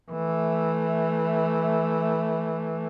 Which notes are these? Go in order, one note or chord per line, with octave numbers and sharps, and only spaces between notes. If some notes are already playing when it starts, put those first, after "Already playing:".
E3 A3